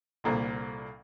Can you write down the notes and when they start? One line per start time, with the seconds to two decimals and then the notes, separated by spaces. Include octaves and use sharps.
0.24 C2 A#2 D3